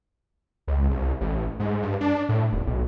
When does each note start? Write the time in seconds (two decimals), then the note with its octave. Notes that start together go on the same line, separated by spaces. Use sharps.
0.68 C#2
0.90 C2
1.21 A1
1.59 G#2
1.82 G2
2.00 D4
2.29 A2
2.52 D#1
2.67 B1